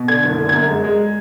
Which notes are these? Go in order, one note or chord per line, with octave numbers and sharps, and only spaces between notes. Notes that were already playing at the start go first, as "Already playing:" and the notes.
Already playing: B2
D3 G#6
F#1
D3
F#2 G#6
G#3
G#3